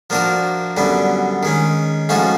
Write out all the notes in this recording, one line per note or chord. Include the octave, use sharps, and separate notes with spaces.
F3 A#3 D4 F#4 A#4
F#2 D3 G3 B3
D#3 G#3 C#4
G#2 F3 A3 C#4 F#4